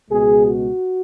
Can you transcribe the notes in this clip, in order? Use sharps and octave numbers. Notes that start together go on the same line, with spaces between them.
C#2 B2 G#3 G#4
F#4